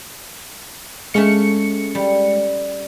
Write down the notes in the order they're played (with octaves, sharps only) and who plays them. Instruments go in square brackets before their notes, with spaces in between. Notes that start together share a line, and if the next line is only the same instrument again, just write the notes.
[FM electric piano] G#3 C#7 [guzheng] A3 C#4 F5
[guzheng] G3